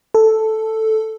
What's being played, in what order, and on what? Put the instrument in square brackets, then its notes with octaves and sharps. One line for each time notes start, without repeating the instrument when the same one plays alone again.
[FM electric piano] A4